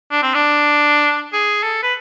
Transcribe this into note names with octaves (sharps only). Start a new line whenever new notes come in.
D4
C4
D4
G#4
A4
B4